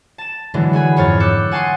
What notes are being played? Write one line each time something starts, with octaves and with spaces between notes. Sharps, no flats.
A5 E7
D3 E3 F#3 G#3 B3
F#4 G#4 G#5 B5
F2 G#2 C#5 F6 A6
D6 E6 F#6 G6 C#7
F#5 G#5 A5 C6 C#6 D#6